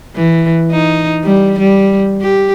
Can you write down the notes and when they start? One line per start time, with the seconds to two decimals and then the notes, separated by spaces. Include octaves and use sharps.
0.15 E3
0.71 D#4
1.24 G3
1.59 G3
2.21 G4